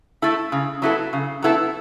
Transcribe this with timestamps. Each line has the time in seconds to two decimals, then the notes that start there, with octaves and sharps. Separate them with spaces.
0.22 A3 E4 A4
0.52 C#3
0.82 F#3 B3 E4 A4
1.13 C#3
1.42 F#3 B3 E4 A4